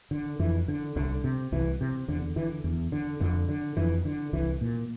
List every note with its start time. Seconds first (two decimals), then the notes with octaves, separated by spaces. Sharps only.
0.11 D3
0.39 F2 E3
0.68 D3
0.96 C2 D3
1.24 C3
1.52 C2 E3
1.81 C3
2.08 E2 D3
2.36 D3 E3
2.64 E2
2.92 D3
3.21 F2 D3
3.49 D3
3.77 F2 E3
4.05 D3
4.33 C2 E3
4.61 A#2